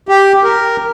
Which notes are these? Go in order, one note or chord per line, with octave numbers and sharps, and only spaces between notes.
G4
A#4